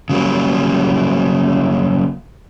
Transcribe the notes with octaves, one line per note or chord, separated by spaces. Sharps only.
C#3 F#3 G3 A#3